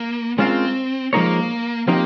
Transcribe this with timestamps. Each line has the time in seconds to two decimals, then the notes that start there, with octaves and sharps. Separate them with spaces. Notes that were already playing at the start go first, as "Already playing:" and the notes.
Already playing: A#3
0.38 G#3 C4 C#4 F4 A#4 F5
1.13 F3 G#3 A#3 D#4 A#4 C#5
1.87 F3 A#3 C4 D#4 G4